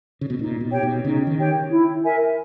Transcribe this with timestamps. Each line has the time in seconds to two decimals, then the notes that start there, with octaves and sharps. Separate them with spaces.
0.21 C#3
0.30 B2
0.39 A#2 D#4
0.61 B2
0.71 G4 C#5 G5
0.83 B2
1.05 C#3 D#4
1.27 D#3
1.37 G4 C#5 G5
1.70 E4
2.03 A#4 E5 G#5